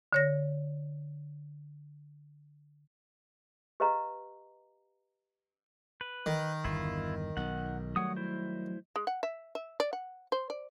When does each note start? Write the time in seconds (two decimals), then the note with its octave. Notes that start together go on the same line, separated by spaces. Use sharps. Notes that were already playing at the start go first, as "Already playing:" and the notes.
0.13 D3 C#5 A#6
3.80 G4 B4 D#5 F5 A#5
6.01 B4
6.26 D#3
6.64 G1 E2 E4 F4
7.37 B1 F#5
7.96 F#3 G3 A3 C#5 F#5 D#6
8.16 E4 C5
8.96 G#3
9.07 F#5
9.23 E5
9.55 E5
9.80 D5
9.93 F#5
10.32 C5
10.50 D5